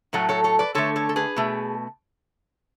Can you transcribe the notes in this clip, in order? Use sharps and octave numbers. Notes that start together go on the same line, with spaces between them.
A2 F#3 A3 A4 C#5
A4 C#5
A4 C#5
B4 D5
D3 A3 A4 C#5
A4 C#5
A4
G#4 B4
B2 A3